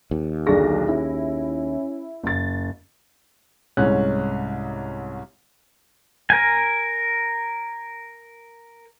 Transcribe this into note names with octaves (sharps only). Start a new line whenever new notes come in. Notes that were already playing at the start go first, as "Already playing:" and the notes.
D#2
B1 D3 D4 G#4 A#6
C#4 E4
F#1 A6
C2 G#2 C#4 F#6
A#4 G#5